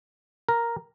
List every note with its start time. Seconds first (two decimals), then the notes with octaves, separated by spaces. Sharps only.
0.49 A#4